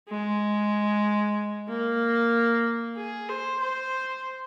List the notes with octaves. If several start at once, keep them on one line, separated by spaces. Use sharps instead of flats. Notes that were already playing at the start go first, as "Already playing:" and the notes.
G#3
A#3
G#4
C5
C5